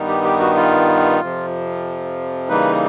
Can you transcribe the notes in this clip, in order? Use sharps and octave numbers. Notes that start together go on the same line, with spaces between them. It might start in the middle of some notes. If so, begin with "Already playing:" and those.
Already playing: G2 D#3 G3 B3 D#4
G4
G4
F#4
F4
F2 C3 F3
C#3 E3 G3 A#3 D#4 B4